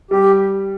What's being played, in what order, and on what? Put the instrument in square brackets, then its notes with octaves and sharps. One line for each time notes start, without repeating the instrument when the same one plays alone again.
[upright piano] G3 [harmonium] G4